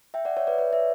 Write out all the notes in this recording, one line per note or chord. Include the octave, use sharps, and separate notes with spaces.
E5 G5
D5 F#5
C#5 E5
B4 D5
B4 D5
C#5 E5